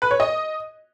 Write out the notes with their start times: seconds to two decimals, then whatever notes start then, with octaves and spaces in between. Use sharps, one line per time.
0.02 B4
0.11 C#5
0.20 D#5